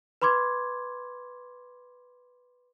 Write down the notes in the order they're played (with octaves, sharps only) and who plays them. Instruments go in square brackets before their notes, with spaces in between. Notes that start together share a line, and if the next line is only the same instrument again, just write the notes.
[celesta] B4 B5 C6 D6 G#6